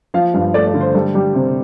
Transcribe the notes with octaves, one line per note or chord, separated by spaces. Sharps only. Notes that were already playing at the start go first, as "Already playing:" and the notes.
F3 F5
G2 F5
A3 D5
D5
D3
C5
G3 A4
G3 G4
C3 C5